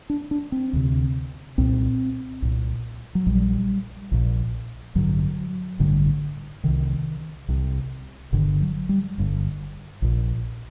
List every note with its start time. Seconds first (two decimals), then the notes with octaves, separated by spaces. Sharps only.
0.10 D4
0.31 D4
0.52 C4
0.73 D2 C3
1.58 C2 A#2 C4
2.42 C2 A#2
3.15 F#3
3.26 A#1 A#2 G3
4.11 A#1 A#2
4.95 A1 G2 D3 F#3
5.79 A1 G2 D3
6.64 C2 C3 D#3
7.48 C2 C3
8.32 G1 G2 D3 D#3
8.61 F#3
8.89 G3
9.18 G1 G2 D3
10.02 A#1 A#2